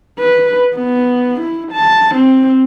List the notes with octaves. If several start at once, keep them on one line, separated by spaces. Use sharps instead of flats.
B4
B3
E4
A5
C4